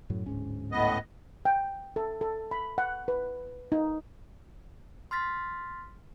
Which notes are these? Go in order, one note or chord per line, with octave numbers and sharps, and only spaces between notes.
F#2 A2 F#3
D1 G#2 C#4
A2 B3 D#5
G5
A4
A4
B5
F#5
B4
D#4
C6 F6 A6 B6